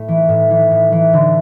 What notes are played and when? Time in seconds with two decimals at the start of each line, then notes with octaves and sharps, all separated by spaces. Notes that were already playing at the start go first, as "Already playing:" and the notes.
Already playing: A2 A3
0.08 E3
0.29 A2
0.50 E3
0.71 A2
0.92 E3
1.13 D3